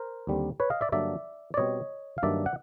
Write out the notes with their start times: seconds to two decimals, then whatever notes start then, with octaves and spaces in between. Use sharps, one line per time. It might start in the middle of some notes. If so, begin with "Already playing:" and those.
Already playing: A#4 C5
0.27 D#2 D3 G3 C4
0.60 B4 C#5
0.70 D#5 F5
0.81 D5 E5
0.92 G2 D3 F#3 A#3 D4 D5 E5
1.54 D5
1.57 B2 G3 C4 C#5 D#5
2.18 F5
2.23 G2 D#3 F#3 A#3 D4 D5 E5
2.46 F#5